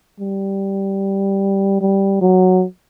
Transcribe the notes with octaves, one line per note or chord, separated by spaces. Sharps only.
G3
G3
F#3